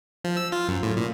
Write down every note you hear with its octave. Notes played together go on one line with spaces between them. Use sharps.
F3
E6
F4
F#2
A2
A#2